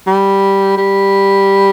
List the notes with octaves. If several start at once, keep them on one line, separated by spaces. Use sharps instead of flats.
G3
G3